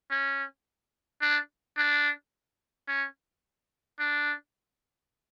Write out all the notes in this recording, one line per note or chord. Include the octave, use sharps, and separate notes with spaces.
C#4
D4
D4
C#4
D4